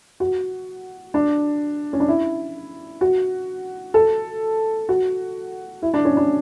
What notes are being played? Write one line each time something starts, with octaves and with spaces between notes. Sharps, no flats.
F#4
D4
C#4
D4
E4
F#4
A4
F#4
E4
D4
C#4
D4